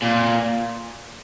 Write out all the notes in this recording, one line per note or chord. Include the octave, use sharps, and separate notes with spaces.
A#2